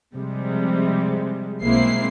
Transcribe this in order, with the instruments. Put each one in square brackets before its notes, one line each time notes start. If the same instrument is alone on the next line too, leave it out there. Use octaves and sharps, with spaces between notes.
[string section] C3 F3 G3 G#3
B1 G#3 A#3 C4 E4 C7